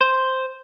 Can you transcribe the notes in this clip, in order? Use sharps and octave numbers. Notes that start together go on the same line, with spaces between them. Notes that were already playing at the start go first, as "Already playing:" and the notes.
C5